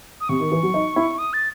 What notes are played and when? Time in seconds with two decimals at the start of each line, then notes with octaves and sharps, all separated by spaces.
0.21 D#6
0.29 C3 C#6
0.40 D#3
0.51 E3
0.63 F#3
0.74 D#4
0.96 E4
1.18 D#6
1.33 A6